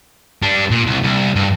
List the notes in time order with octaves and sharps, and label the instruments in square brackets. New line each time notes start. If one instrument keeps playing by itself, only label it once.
[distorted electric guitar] G3 D4
A#2
C2
C2
G2